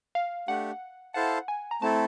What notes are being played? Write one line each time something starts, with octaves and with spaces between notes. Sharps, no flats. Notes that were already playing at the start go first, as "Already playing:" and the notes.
F5
A3 D4 G4 F#5
E4 A4 C5 F5 F#5 A5
G#5
A#5
A3 C4 E4 A4 A5